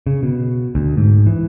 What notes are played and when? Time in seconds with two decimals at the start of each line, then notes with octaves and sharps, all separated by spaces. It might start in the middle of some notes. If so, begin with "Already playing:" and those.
0.07 C#3
0.23 B2
0.75 D2
0.97 G#2
1.26 E3